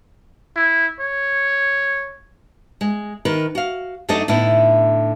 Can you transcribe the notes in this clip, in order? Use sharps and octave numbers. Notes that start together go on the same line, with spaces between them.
E4
C#5
G#3
D#3 A#4 B4
F#4 F5
F#2 A3 D4 D#4 A4 D#5
A2 D3 B3 D#4 E4